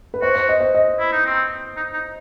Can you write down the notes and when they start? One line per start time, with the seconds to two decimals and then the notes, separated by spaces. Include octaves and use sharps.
0.14 B4
0.22 F#4 C5
0.35 C5
0.49 D#5
0.61 C5
0.75 D#5
1.00 E4
1.13 D#4
1.26 C4
1.77 D#4
1.94 D#4